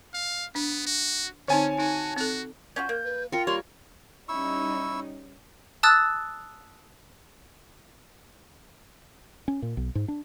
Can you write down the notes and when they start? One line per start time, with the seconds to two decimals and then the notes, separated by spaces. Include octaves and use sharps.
0.14 F5
0.55 B3 D4
0.86 F#4
1.48 D3 C4 C#4 D#4 C#5 G#5 A5
1.78 D#4 F#4
2.17 C4 F#4 A4
2.76 C#4 F4 F#4 G6
2.89 A#3
3.05 B4
3.32 F4 A#4 G5 C#7
3.47 G3 A#3 C#5 C6 F7
4.29 G3 C#4 D#4 E4 C#6 E6
5.83 A5 D#6 E6 F#6 A6
9.48 C#4
9.62 A#2
9.77 B1
9.95 G#2
10.08 D4